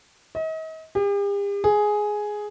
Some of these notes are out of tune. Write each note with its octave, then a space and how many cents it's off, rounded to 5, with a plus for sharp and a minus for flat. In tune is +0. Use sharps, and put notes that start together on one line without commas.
D#5 +40
G4 +45
G#4 +5